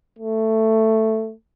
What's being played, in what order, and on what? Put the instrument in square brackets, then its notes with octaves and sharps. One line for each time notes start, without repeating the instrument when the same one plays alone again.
[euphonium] A3